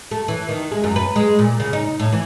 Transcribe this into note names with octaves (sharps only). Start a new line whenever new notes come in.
A3
E3
D#3
G#3
F#2
B4
G#3
A#2
C#3
D#4
A2
E3